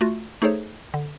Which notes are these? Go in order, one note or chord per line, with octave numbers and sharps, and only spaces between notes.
A3 F4 F#4
A3 D#4 G#4 A4 C5 C#5
D3